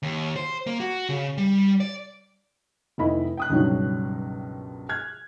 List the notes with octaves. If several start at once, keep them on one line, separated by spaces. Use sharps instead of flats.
D#2
C5
A#3
F#4
C#3
G3
D5
F1 D#3 B3 E4 D#5 B5
G5 D#6 F#6
C#2 G2 B2 D#3 F#3 G3
F6 F#6 G#6